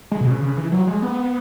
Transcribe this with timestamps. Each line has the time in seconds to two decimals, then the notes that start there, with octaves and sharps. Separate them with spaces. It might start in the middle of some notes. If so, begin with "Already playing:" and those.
0.12 G#3
0.21 B2
0.31 C#3
0.42 C#3
0.57 E3
0.72 F#3
0.87 G#3
1.02 B3